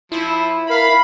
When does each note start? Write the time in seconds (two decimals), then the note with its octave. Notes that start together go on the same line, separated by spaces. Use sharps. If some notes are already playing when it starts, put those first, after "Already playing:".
0.12 F3 E4
0.70 A#4 F5 B5